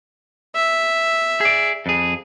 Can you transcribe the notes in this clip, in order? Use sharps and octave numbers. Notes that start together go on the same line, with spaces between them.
E5
G#4 D5
F2 G#4